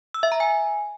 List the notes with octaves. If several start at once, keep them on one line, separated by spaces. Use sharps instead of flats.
E6
E5
A#5
G#5